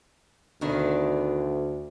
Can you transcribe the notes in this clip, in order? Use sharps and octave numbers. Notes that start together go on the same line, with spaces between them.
D2 B2 D#3 D4